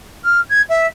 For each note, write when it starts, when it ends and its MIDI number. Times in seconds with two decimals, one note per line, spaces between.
0.24 0.41 89
0.49 0.62 92
0.69 0.87 76